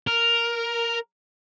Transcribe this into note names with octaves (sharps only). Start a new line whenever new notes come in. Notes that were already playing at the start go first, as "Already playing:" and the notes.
A#4